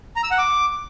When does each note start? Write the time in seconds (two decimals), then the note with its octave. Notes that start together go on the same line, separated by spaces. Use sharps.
0.16 A#5
0.23 E6
0.31 F#5
0.38 D6